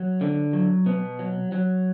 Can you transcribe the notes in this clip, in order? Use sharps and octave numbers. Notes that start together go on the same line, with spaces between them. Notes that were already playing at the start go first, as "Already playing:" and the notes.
Already playing: F#3
D3
F#3
B2 B3
F#3
F#3